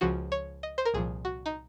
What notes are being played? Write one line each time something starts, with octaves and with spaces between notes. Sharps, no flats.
C#2 C#3 F3 F#4
C#5
D#5
C5
A#4
C2 A#2 F3 G#4
F#4
D#4